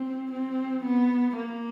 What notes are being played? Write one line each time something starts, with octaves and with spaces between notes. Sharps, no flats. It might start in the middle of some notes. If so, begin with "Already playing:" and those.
Already playing: C4
C4
B3
A#3